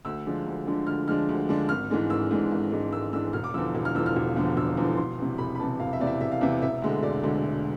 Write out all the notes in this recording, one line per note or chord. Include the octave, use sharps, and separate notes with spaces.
D2 E6
D3 F3 G#3 D4
D2
D3 F3 G#3 D4
D2 F6
D3 F3 G#3 D4 F6
D2
D3 F3 G#3 D4
G#1 F6
G#2 E3 G#3 D4
G#1 E6
G#2 E3 G#3 D4
G#1
G#2 E3 G#3 D4
G#1 E6
G#2 E3 G#3 D4 E6
E1 F6
D6
E2 D3 F3 E6
E1
F6
E2 D3 F3 E6
F6
E1
E2 D3 F3
E1 E6
E2 D3 F3
E1 C6
E2 C3
E1 B5
B5
E2 C3 A5
E1 F5
E5
E2 C3 D5
E5
E1 E5
F5
E2 C3 E5
E1 E5
D2 D3 G#3
E1 D5
D2 D3 G#3
E1